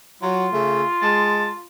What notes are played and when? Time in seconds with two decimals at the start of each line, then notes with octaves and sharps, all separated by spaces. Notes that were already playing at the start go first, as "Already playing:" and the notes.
0.23 F#3 F4
0.52 C#3 A3
1.02 G#3 A5